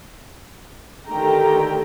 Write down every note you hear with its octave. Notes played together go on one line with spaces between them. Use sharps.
D3 D#3 A3 G4 G5 A#5